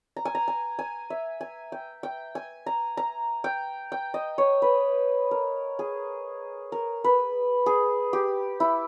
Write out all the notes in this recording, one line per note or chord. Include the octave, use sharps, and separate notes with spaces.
A#5
G#5
A#5
G#5
G#5
E5
G#5
G5
G5
G#5
A#5
A#5
G5
G5
D#5
C#5
B4
A#4
G#4
A#4
B4
G#4
G4
E4